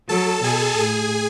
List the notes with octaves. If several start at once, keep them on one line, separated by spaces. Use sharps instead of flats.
F#3 A4 A5
B2 G#4 G#5
A2 G#4 G#5